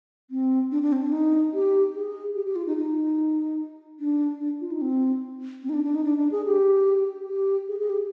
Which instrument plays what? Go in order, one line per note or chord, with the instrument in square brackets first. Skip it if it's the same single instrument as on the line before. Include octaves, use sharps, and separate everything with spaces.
[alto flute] C4
D4
D4
C4
D4
D#4
G4
G#4
G4
G4
F4
D#4
D#4
D4
D4
F4
D#4
C4
C4
D#4
D4
D4
D#4
D4
D4
G#4
G4
G4
G#4
G#4
G4